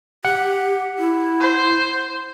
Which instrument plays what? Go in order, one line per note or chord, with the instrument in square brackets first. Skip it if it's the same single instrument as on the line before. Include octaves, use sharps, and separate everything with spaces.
[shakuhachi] G4 [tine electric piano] F#5
[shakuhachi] E4
[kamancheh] C5